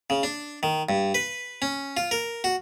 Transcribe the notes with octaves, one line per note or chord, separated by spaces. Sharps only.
C#3
D4
D#3
G2
B4
C#4
F4
A#4
F#4